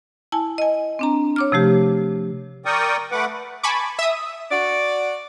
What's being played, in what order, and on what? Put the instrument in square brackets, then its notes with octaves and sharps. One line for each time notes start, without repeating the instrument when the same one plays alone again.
[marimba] E4 G#5 A5
D#5 G#5
C4 D4 A#5
C#5 D6 F6
C3 F3 A3 G4
[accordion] A#4 D5 G5 C#6 D#6
A3 B4 F#5 D6
[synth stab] G#5 A5 B5 C#6 D6
E5 D#6
[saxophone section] F#4 D5